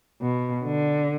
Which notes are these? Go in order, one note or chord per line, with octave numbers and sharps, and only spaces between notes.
B2
D3